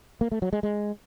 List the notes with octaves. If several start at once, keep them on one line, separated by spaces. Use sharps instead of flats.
A#3
A3
F#3
G#3
G#3